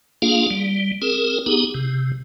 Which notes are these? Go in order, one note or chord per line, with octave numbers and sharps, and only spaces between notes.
A#3 D4 F4 G#4 F5
G3
C4 G#4 A#4
B3 D#4 G4 G#4
C3